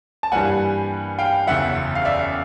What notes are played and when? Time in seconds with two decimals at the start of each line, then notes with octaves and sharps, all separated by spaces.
0.23 A5
0.31 G2 E3 G3 A#3 F#5 G#5
1.19 F5 G5
1.47 F#1 E2 C#3 E5 F#5
1.95 F5
2.05 D5 E5